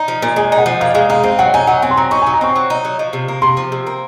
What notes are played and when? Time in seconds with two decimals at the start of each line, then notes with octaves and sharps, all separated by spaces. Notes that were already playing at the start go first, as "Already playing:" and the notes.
Already playing: D#4
0.08 F3
0.22 A#2
0.36 G#3 G#5
0.52 D#4
0.58 F#5
0.66 F3
0.81 A#2 F5
0.95 G#3 F5
1.10 D#4 F5
1.24 C4 F5
1.39 F#3 F#5
1.54 D#4 G#5
1.67 F#3 F#5
1.82 C4 G#5
1.91 C6
1.97 F#3 A#5
2.11 D#4 C#6
2.22 G#5
2.27 F#3
2.34 A#5
2.41 C4 C#6
2.56 F#3
2.70 D#4
2.85 F#3
2.99 F3
3.13 C3
3.28 A#3
3.42 C3 C6
3.57 F3
3.72 C3
3.87 A#3